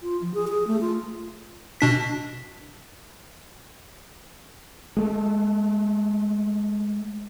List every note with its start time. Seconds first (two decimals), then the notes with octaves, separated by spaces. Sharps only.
0.02 F4
0.22 F3
0.34 G#4
0.48 G#4
0.67 A3
0.81 F4
1.81 B2 D4 B6
4.97 G#3 A3